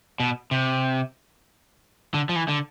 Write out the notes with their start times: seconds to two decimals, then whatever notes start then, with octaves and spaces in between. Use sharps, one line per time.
0.20 B2
0.51 C3
2.14 D3
2.29 F3
2.36 E3
2.48 D3